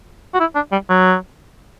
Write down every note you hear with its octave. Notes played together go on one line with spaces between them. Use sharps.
F#4
E4
D4
G3
F#3